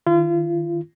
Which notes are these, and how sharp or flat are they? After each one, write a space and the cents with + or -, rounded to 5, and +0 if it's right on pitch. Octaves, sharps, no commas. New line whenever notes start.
D#3 +0 F4 -35